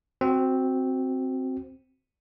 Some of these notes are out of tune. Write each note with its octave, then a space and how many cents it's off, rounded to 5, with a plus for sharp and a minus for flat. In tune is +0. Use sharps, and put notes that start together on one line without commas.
C4 +0 F#4 +0